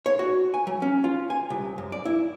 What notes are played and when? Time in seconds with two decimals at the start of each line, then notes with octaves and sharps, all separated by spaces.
0.06 C#5
0.19 F#4
0.54 G#5
0.67 F#3
0.82 C#4
1.04 F4
1.30 G#5
1.50 C2
1.78 F#2
1.92 D5
2.05 E4